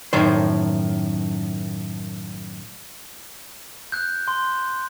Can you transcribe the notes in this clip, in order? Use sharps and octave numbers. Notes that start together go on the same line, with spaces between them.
F#2 A2 D#3 C5
F#6 G6
C6